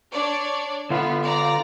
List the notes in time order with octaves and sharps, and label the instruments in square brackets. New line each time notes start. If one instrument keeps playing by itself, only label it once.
[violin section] D4 C#5 D5
[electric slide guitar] D3 F4 [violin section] B3
[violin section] D5 A#5